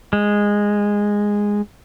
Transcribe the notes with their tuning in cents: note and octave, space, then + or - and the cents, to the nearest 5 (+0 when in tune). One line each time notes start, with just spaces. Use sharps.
G#3 -10